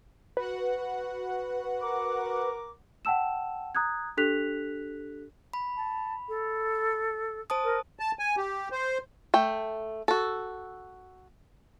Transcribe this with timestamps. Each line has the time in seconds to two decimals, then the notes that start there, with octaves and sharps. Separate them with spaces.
0.37 F#4 B4 F#5
1.82 A#4 A#5 D6
3.05 F#5 G5 A5 E6 E7
3.75 A#5 D#6 F#6 G#6
4.17 D4 G4 A4 F#6 B6 F7
5.53 B5
5.76 A5
6.28 A4
7.50 C5 A5 D#6
7.63 A#4
7.99 A5
8.19 G#5
8.37 G4
8.72 C5
9.34 A3 G5
10.08 F#4 A4